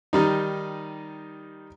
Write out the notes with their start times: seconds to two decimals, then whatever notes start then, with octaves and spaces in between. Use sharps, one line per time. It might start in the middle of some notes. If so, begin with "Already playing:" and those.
0.13 D#3 G3 D#4